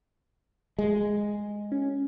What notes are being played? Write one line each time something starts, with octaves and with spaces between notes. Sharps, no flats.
G#3
C#4